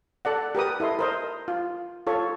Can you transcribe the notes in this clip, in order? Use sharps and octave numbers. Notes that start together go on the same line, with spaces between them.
A4 D5 F#5
G4 A#4 B4 D#6
E4 A4 D#5 C6
A#4 C5 D#5
F4
F4 A4 C#5